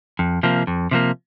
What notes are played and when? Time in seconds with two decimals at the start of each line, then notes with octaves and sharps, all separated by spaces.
0.19 F2
0.43 C3 F3 A#3
0.67 F2
0.91 C3 F3 A#3